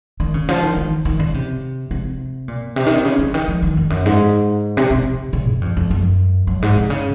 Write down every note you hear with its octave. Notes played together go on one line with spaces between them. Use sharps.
D#3
C#3
F3
D#3
D#3
D#3
C#3
C3
C3
A#2
C3
D#3
C3
C#3
C#3
D#3
F3
D#3
F2
F#2
G#2
C3
C3
C#3
F#2
F2
F2
F#2
F#2
G#2
C3
C#3